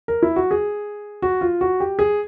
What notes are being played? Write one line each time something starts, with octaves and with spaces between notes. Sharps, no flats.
A#4
E4
F#4
G#4
F#4
F4
F#4
G4
G#4